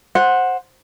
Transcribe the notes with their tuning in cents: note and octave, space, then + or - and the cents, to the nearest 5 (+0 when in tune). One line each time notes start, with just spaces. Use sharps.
C5 +10 F#5 -10